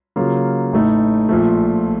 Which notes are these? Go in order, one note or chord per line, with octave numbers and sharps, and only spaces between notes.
C#3 F#3 A#3 F4
A1 A2 A3 D#4
A#1 A#2 F3 A3